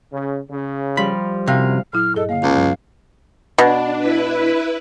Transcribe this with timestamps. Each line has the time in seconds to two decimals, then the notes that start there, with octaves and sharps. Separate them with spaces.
0.11 C#3
0.50 C#3
0.97 F3 G3 B5
1.48 F#2 C3 E4 F5
1.93 A#2 F#3 E4 F6
2.15 G2 G#4 A4 D#5
2.29 D3 A#3 F5
2.43 C#2
2.56 G2 F#3
3.58 B2 D4
3.98 E4 B4